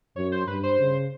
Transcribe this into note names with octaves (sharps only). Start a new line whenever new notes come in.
F#2 C#5
C5
G2 B4
C5
C#3